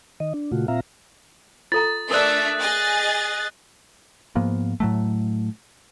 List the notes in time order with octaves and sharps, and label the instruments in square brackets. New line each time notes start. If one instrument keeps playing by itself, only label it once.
[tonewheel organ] D#3 D#5
D4
A#2 C#3 A3 F4 F#4
A#2 C4 F4 E5 F5 A#5
[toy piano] F4 A4 A#5 [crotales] A6
[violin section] A3 D4 E5 [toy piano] A#4 D5 [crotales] D#6 F#6
[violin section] G#4 D#5 A6
[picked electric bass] G#2 F3 A#3 B3
A2 F#3 A3